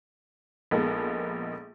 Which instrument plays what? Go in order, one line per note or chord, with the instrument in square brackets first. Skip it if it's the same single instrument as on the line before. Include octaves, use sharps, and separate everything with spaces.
[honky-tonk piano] A#1 G#3 A#3 B3 D#4 A4